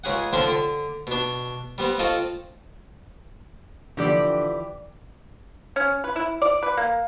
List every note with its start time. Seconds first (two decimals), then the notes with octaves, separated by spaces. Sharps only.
0.04 C#2 C#3 G#4 F#5
0.33 D3 F3 C4 D4 A4
0.47 D3 B5
1.07 B2 D4
1.78 G3 B3 C4
1.99 C4 F4 A4 D#5 F5 C#6
3.97 D3 E3 F3 G4 D5
5.76 C#4
6.04 B4
6.16 E4
6.42 D5
6.63 B4
6.77 A#3